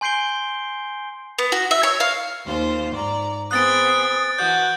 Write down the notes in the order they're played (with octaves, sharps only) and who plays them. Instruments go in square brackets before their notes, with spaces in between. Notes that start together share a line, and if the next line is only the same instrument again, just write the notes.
[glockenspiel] G#5 C6 G6 C7 D7 G7
[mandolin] B3
F#4
E5
C#5
F5
[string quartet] D#2 F4 C5
G#2 D5 A#5
[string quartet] B3 C4 G#4 [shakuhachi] D#6 [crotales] F#6 A6 D7
[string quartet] E3 F#4 A4 [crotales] G6